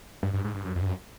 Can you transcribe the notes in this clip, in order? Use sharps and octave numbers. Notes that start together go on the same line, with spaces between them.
G2
G2
G#2
G2
F#2
F2
G2
F#2